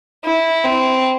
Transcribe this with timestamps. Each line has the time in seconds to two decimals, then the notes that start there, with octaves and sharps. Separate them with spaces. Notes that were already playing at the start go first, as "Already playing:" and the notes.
0.24 E4
0.64 C4